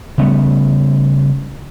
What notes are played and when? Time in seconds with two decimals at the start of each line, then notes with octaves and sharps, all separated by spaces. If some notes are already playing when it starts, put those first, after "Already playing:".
0.18 C#3 G3 A3 B3